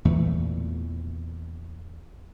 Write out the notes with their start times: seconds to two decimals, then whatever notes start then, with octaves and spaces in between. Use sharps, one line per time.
0.05 E2 A#2 E3 A3